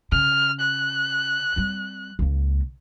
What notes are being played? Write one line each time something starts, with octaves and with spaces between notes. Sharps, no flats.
C#3 F6
F#6
G3 C4
C#2 A#3